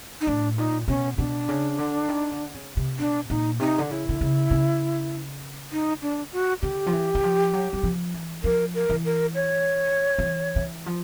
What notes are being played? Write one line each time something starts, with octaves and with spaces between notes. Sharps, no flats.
D#4
A2 D4
A#2 D#4
B2 C#4
B2 D4
C#3
D3
D#3
D3
C#3
C3
B2 D4
A#2 D#4
C3 D#4
D3
C#3 E4
D3
C#3
C#3
D#4
D4
F#4
D3 G4
F3
E3
E3
F3
F#3
F#3
F3
E3
F3 A#4
A#4
E3
A#4
C#5
F3
E3
E3
F3